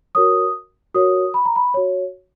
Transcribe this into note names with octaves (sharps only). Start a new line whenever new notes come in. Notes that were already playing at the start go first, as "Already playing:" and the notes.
F#4 A#4 C#5 D#6
F#4 A#4 C#5 D#6
B5
A#5
B5
F#4 C#5